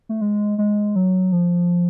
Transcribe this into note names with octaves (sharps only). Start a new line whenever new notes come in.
A3
G#3
G#3
F#3
F3